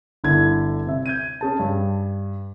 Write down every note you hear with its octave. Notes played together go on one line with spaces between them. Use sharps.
G1 D3 E4 G#6
C3 E5
G6 G#6 D#7
C#4 G#4 A5
G2